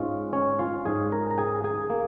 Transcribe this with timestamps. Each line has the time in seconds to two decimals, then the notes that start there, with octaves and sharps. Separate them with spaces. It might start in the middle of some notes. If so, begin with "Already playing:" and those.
Already playing: G#2 G#3 C#4 F4
0.33 C#4 C#5
0.59 F4 F5
0.85 G#2 G#3 C#4 G#4 G#5
1.12 A#4 A#5
1.31 A#5
1.38 G#4 G#5
1.64 G#4 G#5
1.90 A#3